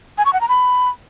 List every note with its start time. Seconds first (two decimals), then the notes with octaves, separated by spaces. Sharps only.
0.18 G#5
0.26 C#6
0.33 F#5
0.41 A#5
0.49 B5